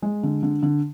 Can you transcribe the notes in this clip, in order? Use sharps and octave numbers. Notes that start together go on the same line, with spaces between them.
G#3
D3
D3
D3